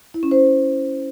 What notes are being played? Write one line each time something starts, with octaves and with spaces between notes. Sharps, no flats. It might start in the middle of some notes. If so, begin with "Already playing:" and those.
E4
C#4
C5